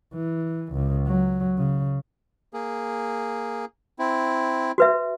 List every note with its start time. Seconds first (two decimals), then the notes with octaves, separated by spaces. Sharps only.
0.14 E3
0.73 C#2
1.06 F#3
1.58 C#3
2.53 A#3 G#4
3.99 C4 E4
4.78 F#4 B4 E5